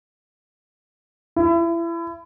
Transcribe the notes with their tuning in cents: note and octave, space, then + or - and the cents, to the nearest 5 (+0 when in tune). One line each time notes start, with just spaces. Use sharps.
E4 +30